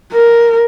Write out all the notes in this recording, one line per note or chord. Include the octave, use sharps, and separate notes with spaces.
A#4